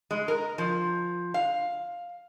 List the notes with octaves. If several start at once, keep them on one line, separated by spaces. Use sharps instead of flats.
G#3
A#4
F3
F5